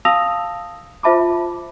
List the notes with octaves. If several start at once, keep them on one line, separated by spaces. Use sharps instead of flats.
F5 A5 D#6 E6 A#6 F7
F4 C5 E5 A5 B5 D6